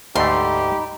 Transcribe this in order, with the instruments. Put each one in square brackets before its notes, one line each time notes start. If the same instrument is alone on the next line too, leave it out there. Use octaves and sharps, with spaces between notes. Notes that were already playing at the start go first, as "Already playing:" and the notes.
[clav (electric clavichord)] D2 G#2 A3 [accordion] D#4 B5 [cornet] G4 [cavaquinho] C6